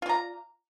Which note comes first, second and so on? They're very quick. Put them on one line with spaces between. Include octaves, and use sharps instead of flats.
F4 D5 A#5